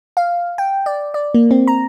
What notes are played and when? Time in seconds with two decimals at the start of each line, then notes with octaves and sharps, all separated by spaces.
0.17 F5
0.58 G5
0.86 D5
1.14 D5
1.34 A#3
1.51 C4
1.68 A#5